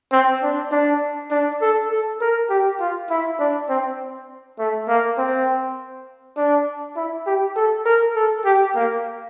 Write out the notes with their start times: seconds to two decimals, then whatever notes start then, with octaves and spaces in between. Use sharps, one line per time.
0.12 C4
0.42 D4
0.71 D4
1.30 D4
1.61 A4
1.90 A4
2.21 A#4
2.50 G4
2.80 F4
3.10 E4
3.39 D4
3.69 C4
4.59 A3
4.88 A#3
5.18 C4
6.37 D4
6.96 E4
7.26 G4
7.56 A4
7.85 A#4
8.16 A4
8.45 G4
8.75 A#3